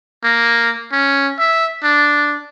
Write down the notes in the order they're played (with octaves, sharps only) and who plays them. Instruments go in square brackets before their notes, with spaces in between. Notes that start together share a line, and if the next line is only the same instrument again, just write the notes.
[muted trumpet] A#3
C#4
E5
D4